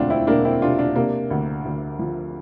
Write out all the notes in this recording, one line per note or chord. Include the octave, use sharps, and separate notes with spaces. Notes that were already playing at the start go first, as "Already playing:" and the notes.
Already playing: E1 D2 A3 C4 D4 F4
C4 E4
E1 A#3 D4
C4 E4
C3 D4 F4
D4 F4
C3 A#3 D4
D2
D2
F3